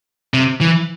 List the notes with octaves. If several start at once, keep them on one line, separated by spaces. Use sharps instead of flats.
C3
E3